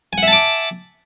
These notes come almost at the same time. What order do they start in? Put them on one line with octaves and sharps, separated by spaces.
G#5 F#5 E5 A5 D6